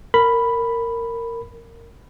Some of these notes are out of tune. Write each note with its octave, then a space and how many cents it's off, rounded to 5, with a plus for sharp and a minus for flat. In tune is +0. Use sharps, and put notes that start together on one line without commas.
A#4 -15 B5 +0